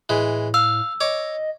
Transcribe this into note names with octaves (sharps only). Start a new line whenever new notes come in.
A2 E3 G#3
F5 E6
C#5 D#5 D6